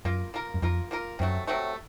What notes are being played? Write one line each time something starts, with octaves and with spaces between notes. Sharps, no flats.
F#2 A#3 F4 A#4
A#3 F4 A#4
F#2
F2 A#3 F4 A#4
A#3 F4 A#4
F#2 C3 F#3 A3
C3 F#3 A3